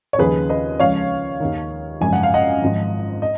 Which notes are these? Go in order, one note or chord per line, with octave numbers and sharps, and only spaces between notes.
C#5
D#2 C#3 F3 G#4 B4
B4 D#5
C#2 C#3 F3 C#5 F5
D#2 D#3
G#1 F#2 C#3 F3 G#5
F#5
F5
D#5 F#5
G#1 G#2 F3
D#5